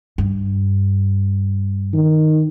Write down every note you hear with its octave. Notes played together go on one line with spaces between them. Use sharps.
G2
D#3